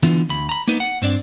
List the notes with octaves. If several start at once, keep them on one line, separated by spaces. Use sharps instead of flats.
D3 E3 B3 F4
D2 B5
A#5 B5
A#3 B3 D#4 B4
F#5
G2 C4 D4 D5